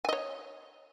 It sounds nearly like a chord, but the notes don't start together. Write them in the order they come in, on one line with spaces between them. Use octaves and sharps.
G#5 D#5 C#5